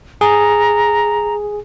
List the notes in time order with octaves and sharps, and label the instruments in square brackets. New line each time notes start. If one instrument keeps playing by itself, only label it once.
[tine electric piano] G#4 [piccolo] A#5